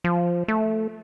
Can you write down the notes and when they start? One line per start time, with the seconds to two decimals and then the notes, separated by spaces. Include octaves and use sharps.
0.04 F3
0.48 A3